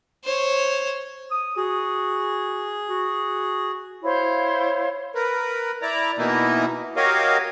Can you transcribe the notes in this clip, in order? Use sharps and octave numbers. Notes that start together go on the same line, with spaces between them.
C5 C#5
D#6
F#4 G#4
F#4
E4 C5 C#5 F5
A#4 B4
E4 D5 A#5
B2 E3 A#3 D#4 E4
F#4 G4 A#4 C#5 D#5 F5